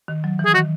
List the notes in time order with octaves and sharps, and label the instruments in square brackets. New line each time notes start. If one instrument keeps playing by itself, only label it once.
[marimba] D#3
F#3
E3
[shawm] G#4
[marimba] D#3 [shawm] F#4